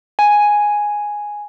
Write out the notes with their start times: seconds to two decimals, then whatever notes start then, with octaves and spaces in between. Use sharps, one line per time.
0.19 G#5